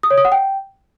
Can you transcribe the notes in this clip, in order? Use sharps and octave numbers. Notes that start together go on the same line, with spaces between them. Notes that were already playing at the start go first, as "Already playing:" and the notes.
D#6
C#5
D#6
F#5
G5